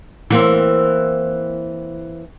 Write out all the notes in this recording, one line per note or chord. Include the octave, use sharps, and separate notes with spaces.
E3 A#3 C4